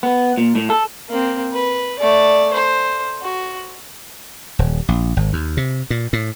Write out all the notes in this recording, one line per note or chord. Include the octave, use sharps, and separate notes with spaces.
B3
A#2
A2
A4
A#3 C4
B4
A3 D5
C5
F#4
D#1
A#1
G#1
D#2
C3
A#2
A2